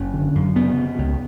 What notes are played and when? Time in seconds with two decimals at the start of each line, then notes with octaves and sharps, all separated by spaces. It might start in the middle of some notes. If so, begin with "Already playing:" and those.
Already playing: F#1 C#4
0.14 D3
0.35 F#2
0.55 C#3 B3
0.77 C#3
0.98 C#2